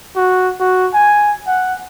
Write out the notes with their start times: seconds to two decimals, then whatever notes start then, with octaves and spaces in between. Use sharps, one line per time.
0.16 F#4
0.60 F#4
0.94 G#5
1.47 F#5